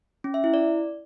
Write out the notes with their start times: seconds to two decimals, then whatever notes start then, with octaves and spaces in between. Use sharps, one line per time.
0.24 C#4
0.34 E5
0.44 E4
0.54 D5